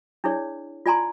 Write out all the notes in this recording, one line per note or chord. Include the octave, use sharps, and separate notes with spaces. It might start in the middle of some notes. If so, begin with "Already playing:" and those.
D4 E4 G#4 C#5 D5
F4 D5 G#5 A#5 C6